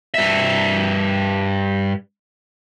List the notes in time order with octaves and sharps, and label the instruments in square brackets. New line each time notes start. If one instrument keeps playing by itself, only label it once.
[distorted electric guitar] G2 E5